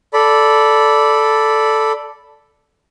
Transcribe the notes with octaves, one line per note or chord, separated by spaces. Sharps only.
A4 D5 B5